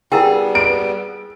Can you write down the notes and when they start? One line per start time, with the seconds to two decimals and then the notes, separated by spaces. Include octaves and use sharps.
0.12 G3 B3 E4 G#4 A#4 G5
0.55 D7